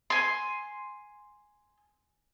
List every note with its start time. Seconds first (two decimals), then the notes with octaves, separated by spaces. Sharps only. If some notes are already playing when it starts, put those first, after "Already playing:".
0.10 G#5 C6